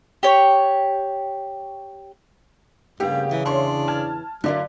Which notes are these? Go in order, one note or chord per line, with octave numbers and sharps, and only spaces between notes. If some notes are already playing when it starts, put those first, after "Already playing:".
G4 C#5
G2 C#3 A#3 B3 G4
E3 F#3
E2 E3 D4 C#5 C6
A5 F6 G#6
D3 F#3 E4 F4 A#4 D5